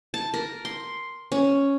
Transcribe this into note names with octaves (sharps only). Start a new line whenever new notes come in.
A5
A#4
C6
C#4